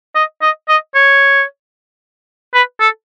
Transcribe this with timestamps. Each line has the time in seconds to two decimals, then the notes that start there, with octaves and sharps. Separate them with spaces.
0.15 D#5
0.42 D#5
0.69 D#5
0.95 C#5
2.54 B4
2.80 A4